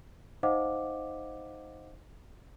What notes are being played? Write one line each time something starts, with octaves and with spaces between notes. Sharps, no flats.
D#4 C5 D#5 F5 F#5 D6